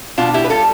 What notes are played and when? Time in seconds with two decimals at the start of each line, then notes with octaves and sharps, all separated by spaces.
0.18 B2 D4 F4
0.34 E4 G4
0.44 B4
0.50 G3 F4 A4